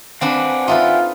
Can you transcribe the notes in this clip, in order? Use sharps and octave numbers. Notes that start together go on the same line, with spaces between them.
C4 D4 B4 F5 F#5 G#5
D#4 F4 A4 B4 E5